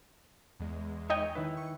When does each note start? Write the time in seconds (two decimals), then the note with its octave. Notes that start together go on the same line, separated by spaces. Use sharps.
0.60 E2 G#3
1.10 D#4 C#5 D#5 G5 G#5
1.35 D#3 E4 B4
1.57 C#6